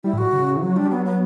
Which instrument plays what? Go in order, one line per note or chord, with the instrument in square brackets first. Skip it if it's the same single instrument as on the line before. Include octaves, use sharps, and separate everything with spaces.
[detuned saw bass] G3 [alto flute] E4
[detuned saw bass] A2 [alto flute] F#4
[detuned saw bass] C#3
E3
[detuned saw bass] F#3 [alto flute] F#4
[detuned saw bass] G3 [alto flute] D4
[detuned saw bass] F#3 [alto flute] B3
[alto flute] B3